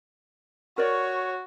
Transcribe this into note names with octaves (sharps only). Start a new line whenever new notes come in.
F#4 A#4 C#5 D5